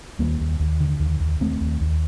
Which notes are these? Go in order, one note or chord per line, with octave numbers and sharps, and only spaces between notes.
D#2 G3 A#3
D#2
D#2
D3
D#2
D#2
D#2 A3 C4
D#2
D#2